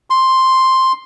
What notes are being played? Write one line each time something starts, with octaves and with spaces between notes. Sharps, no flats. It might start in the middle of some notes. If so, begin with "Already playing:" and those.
C6